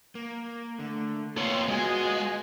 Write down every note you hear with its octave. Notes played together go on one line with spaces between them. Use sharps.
A#3
D3 A3
A#3 B3 F4 C#5 C6
G#3 F#4 D#5 G#5